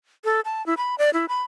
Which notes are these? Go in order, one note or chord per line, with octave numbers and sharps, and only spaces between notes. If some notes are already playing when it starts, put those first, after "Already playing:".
A4
A5
E4
B5
D5
E4
B5